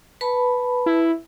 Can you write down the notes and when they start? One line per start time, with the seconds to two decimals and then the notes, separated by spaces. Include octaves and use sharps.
0.21 B4 A5 B5
0.86 E4